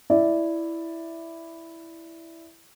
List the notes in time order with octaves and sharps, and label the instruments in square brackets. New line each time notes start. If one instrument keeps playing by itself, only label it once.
[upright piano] E4 D5 E5